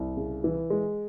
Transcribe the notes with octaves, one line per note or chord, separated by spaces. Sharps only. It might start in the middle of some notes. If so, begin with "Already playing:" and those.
Already playing: C2
C#3
E3
G#3